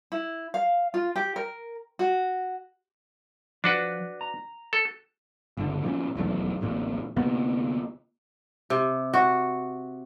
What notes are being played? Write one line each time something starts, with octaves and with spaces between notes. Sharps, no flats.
E4
F5
F4
G4
A#4
F#4
F3 D4 F#4 B4
A#5
A4
G1 C#2 D3
A#2 F3 C4 C#4
D#1 B1 E2 A3
D1 A1 A#2
D2 C3 A#3 B3
C3
F#4